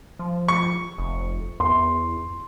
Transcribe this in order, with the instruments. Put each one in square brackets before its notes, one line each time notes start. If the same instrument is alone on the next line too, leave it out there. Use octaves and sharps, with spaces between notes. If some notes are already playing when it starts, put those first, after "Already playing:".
[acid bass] F3
[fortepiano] C#6
[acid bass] F1
[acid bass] E2 [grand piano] C6